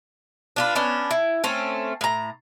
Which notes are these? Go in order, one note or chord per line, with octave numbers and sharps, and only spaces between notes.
D4 F4 B4
B3 C#4 D4
E4
A3 C4 C#4
A2 A#5